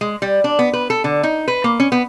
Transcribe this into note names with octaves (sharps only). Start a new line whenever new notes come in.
G#3
G3
D4
B3
B4
A4
D3
D#4
B4
A#3
C#4
B3